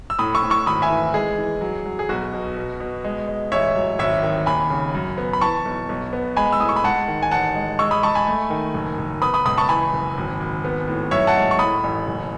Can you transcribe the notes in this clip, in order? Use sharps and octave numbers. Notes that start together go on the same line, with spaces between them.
E6
A2 B5 D#6
C#6 E6
A2
C#6 E6
G#1 B5 D#6
E5 G#5
E3
G#3 G#4
E3
F#3
F#3
G#4
B1 F#4
B2
B2
B2
G#3
G#3
A1 C#5 E5
F#3
G#1 C#5 E5
D#3
D#2 G#5 B5
C#3
F#2
B3
B5
E3 A5 C#6
B1
B1
B3
G#3 G#5 B5
E6
A2 D#6
C#6
B5
G#3 F#5 A5
D#3
G#5
A1 F#5 A5
G#3
G#3 C#6 E6
B5 D#6
G#3 A5 C#6
G#5 B5
A3
D#3
F#1
F#1
B3 B5 D#6
B5 D#6
C#2 B5 D#6
A5 C#6
E3 G#5 B5
F#1
G#1
G#1
B3
A2
F#2 C#5 E5
F#5 A5
G#3
C#6
A2 B5 D#6
A1
F#1